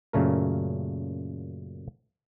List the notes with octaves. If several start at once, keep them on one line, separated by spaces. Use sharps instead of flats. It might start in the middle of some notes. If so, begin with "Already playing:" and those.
F#2 A#2 C#3 A3 A#4